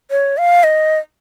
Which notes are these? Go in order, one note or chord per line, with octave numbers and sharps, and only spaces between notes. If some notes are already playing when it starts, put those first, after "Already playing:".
C#5
F5
D#5